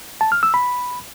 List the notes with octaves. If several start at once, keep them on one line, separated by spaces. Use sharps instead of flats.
A5
F6
E6
B5